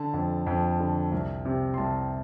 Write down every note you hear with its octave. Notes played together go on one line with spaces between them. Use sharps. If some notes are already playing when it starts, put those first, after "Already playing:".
Already playing: D3 A5
F2
F2
D3
C2
C3
C6
C2 A5